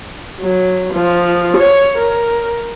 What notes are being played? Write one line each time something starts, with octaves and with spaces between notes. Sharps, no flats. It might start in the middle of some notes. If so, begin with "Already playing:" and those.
F#3
F3
C#5
A#4